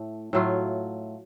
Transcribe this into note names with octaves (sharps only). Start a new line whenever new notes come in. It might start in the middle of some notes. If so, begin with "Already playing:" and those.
Already playing: A2 A3
A2 F#3 A3 F4